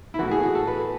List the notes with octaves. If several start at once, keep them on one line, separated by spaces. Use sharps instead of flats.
E4
A2 E3 F#4
G#4
F#4
A4
B4